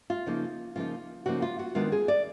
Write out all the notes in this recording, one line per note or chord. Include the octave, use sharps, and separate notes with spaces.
F4
C#3 F3 A#3 D#4
C#3 F3 A#3 D#4 F4
C#3 F3 A#3 D#4 F#4
F4
F#4
D#3 G#3 B3 D4 F4
G#4
D5